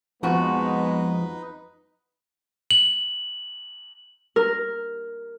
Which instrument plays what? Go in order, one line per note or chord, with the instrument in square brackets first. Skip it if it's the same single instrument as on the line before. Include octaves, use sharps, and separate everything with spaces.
[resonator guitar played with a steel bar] F2 F#4 A5 [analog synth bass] F3 [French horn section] G#3 B3 [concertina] D#4 B4
[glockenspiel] F#7
[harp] A#4